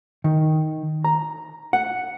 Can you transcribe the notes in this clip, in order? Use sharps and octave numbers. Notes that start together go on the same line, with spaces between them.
D#3
A#5
F#5